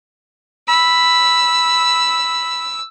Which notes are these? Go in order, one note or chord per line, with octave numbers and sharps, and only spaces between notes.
B5 E6